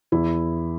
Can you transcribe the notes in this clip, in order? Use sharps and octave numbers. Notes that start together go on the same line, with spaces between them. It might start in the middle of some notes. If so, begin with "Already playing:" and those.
E2 E4